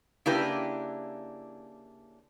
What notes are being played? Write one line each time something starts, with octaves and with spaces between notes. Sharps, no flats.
C#3 A#3 D4 E4 G4 B4